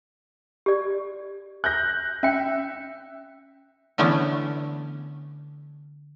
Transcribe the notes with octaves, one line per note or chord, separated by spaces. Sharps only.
G4 D5
F#6 G6 A#6
C#4 E5 G5
D3 E3 A3 B3 C#4 D4